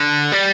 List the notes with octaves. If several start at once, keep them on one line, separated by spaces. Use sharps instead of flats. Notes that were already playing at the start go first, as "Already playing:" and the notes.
Already playing: D3
G3